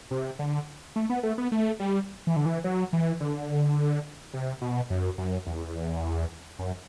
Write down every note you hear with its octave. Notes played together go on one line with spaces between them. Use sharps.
C3
D3
A3
B3
A3
B3
A3
G3
E3
D3
E3
F#3
E3
D3
C3
B2
F#2
F#2
E2
F#2